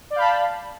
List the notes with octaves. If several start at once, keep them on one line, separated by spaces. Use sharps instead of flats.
D5 F5 A5 B5 G6